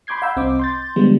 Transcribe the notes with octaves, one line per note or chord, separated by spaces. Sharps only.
B5 C6 D6 G6 G#6 C7
F5 F#5 A#5 B5 E6 G6
C2 C4 D#5 D6
C6 G6 A6
D3 F3 G3 G#3 B3